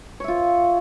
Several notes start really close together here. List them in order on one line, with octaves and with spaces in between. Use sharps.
C#5 E5 F4